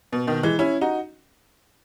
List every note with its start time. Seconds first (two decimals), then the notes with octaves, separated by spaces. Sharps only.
0.13 B2
0.27 B2 D#3
0.43 E3 G#3
0.59 C#4 E4
0.81 D#4 F#4